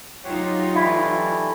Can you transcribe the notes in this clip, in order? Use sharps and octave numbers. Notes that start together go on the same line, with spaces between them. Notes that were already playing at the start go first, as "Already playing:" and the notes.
F#3 D#4 F4 G4 C#5 F#5
E3 G3 A3 E4